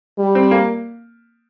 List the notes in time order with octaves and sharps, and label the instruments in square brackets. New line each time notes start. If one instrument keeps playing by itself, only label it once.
[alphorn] G3
[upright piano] C4
A#3